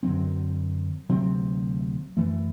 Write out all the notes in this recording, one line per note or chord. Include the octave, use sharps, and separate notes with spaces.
F#2 D3 F#3 C4
D2 C3 F#3 C4
F#2 E3 A3